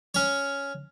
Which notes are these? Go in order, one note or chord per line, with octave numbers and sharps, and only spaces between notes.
C#4 C#5